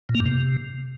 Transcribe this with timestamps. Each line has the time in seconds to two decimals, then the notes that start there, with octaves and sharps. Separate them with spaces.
0.09 A#2
0.15 A#3
0.20 G2
0.26 C3